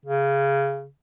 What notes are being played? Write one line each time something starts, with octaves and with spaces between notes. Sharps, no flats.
C#3